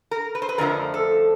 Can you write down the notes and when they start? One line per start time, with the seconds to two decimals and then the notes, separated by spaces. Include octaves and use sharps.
0.11 A#4
0.35 B4
0.42 C5
0.49 B4
0.58 F2 D3 F3 A3 A#4
0.94 A4